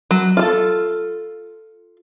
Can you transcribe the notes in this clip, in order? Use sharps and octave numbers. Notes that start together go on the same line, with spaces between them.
F#3
F4 A4